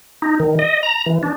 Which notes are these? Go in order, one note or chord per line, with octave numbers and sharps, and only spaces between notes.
D#4
D#3
D#5
A#5
E3
D4